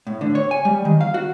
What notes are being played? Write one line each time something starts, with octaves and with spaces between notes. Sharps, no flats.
A2
D3
C#5
G#5
G3
D#3
F5
F#4